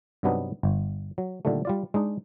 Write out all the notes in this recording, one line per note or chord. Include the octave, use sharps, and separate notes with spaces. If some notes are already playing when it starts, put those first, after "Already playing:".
G2 C3 F#3 B3 D4 D#4
G1
F#3
A#2 D3 D#3 G3 A3
G3 F4 D5
G#3 D4 D#4